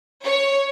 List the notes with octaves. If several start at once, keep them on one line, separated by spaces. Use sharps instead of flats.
C#5